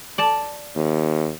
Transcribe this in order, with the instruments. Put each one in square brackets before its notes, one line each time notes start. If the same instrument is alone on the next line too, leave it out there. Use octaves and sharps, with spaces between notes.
[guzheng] D5 A5
[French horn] D#2